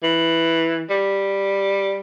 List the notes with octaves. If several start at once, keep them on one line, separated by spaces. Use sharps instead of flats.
E3
G3